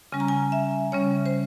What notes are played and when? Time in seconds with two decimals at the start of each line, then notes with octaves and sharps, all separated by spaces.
0.12 C#3 G3 C#4 G#5
0.20 A#5
0.28 G#5
0.52 E5
0.92 C#3 G3 C#4 C#5
1.26 C5